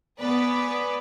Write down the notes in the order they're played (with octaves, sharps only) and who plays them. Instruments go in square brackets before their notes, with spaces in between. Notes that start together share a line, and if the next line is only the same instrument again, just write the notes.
[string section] B3 G#4 B4 D5